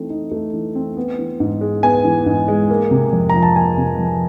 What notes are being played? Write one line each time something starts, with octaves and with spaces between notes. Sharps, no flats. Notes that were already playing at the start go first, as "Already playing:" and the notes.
Already playing: E3 A3 C4 D#4
D#4
A3
E3
C4
B3
E3
G#2
G#3
B3 G#5
E3
G#2
G#3
A#3
C3
F2
F3 A#5
A5
A#3 G#5
C3
F2